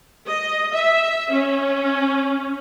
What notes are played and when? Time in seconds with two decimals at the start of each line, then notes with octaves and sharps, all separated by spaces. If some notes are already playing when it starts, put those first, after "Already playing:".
0.24 D#5
0.72 E5
1.30 C#4